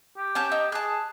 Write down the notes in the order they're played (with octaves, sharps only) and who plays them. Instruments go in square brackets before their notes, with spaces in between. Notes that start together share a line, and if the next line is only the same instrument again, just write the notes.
[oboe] G4
[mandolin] C#4 A5 G6
D#4
[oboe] G#4 [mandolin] A5 F#6